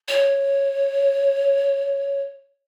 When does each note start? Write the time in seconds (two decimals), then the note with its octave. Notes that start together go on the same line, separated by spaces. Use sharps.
0.08 C#5